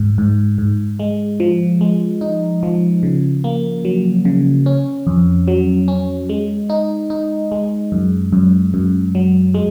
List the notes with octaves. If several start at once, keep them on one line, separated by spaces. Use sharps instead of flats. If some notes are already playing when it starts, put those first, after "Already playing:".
Already playing: G#2
G#2
G#2
G#3
F3
G#3
D#4
F3
C#3
A#3
F#3
C#3
C#4
F2
F#3
C#4
G#3
D#4
D#4
G#3
F#2
F#2
F#2
F#3
G#3